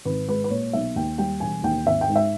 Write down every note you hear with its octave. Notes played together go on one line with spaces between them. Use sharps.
G#1 B4
G#3 B4
B4
A#2 C#5
B1 E5
D#2 G5
G3 G5
E1 G#5
D#2 G5
G#1 E5
G5
G#2
E5